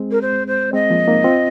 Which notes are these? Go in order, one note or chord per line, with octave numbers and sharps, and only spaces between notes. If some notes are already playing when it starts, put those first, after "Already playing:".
Already playing: G#3 C4
A#4
C5
C5
G#3 C4 D#5
F3 A#3
A#3 D#4
C4 F4